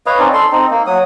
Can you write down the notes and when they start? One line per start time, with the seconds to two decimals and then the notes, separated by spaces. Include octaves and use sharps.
0.06 B4 C#5 D#5 F5
0.19 C4 C#4 D#4 D5
0.33 A4 C6
0.52 C4 D#4
0.71 A#3
0.87 F#3 D#6